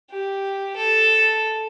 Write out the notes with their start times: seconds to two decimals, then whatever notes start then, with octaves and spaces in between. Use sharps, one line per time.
0.11 G4
0.76 A4